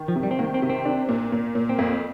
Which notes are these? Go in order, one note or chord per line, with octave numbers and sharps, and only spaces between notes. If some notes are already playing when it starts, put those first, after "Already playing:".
Already playing: D#3
F3
C3
G3
C4
D#3 A#3
C4
C3
C4
D4
A#2
A#2
A#2
C4
F2 A#3